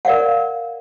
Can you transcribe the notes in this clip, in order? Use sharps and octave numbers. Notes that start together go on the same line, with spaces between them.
A#4 D5 F5 F#5